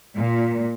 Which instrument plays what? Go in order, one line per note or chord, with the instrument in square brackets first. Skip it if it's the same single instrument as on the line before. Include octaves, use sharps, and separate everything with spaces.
[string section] A#2